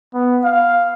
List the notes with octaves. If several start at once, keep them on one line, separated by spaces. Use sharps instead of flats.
B3
F5